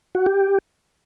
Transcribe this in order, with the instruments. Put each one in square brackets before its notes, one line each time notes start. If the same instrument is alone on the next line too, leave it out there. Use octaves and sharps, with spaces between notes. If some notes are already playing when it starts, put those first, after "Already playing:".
[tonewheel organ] F#4
G4